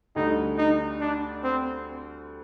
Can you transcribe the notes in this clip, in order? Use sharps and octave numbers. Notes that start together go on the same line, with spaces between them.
D2 D3 G3 D#4
D#4
D4
C4